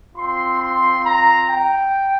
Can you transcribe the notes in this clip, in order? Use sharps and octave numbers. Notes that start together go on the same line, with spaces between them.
C4 F4 C6
C6
A#5
G5